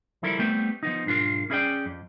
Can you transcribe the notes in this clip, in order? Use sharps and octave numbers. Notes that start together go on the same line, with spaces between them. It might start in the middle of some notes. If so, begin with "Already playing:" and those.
F3 G3 E4 A4 A#4
G3 A3 B3 C4 G5
F3 B3 D#4
B1 G#2 D4 F4 A#4
C#4 E4 G#4 A4 D5 G5
F2